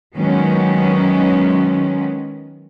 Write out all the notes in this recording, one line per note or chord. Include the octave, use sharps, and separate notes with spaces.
D#3 F#3 G#3 B3 C#4